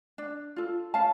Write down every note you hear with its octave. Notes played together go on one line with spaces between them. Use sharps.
D4
F4 A4
C#4 F5 A5